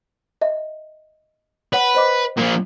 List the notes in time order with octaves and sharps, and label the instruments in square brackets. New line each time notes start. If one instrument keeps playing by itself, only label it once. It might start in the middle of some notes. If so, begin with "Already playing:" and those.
[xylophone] D#5 E5
[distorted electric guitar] B4 [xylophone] C#5 F#5
[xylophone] C5 D#5 D6
[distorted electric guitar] A#2 F3